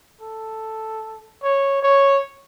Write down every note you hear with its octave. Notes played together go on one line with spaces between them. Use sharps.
A4
C#5
C#5